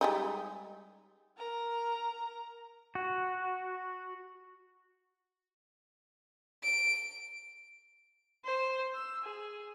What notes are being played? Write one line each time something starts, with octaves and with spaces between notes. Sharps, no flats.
G3 G#3 D#4
A#4 A#5
F#4
D7
C5
E6
G#4